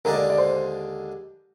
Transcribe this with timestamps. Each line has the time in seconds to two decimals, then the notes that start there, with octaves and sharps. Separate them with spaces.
0.05 D#2 D3 G#3 D4 A#4
0.13 D5
0.30 D5
0.38 C5